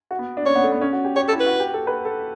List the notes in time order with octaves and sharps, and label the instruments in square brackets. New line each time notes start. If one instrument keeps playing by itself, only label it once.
[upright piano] F#4
B3
D4
[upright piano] C#4 [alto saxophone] C#5
[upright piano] B3
A3
B3
C#4
F#4
G4
[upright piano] G4 [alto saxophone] C#5
[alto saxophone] A4
[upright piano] E4
[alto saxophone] B4
[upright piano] F#4
G4
A4
B4
A4